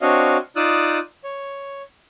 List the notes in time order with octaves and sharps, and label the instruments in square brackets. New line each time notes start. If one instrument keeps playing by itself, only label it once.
[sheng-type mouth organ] C4 D4 F#4 C#5 D#5 F5
D#4 F4 D5 D#6 E6 F#6
C#5